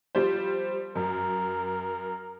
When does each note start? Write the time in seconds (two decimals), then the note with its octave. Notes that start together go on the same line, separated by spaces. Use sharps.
0.15 F3 G3 C5
0.95 F#2 A#4